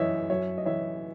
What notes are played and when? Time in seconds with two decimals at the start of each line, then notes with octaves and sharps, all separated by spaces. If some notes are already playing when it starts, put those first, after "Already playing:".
Already playing: F#2 E3 C#5 D#5 E5
0.30 F#2 C#5 E5
0.58 D#5
0.65 E3 C#5 E5